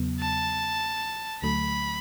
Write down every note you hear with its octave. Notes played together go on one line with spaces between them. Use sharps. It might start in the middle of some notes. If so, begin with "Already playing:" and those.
Already playing: E2 C#3 F#3 B3
A5
D2 D3 F#3 A3 B5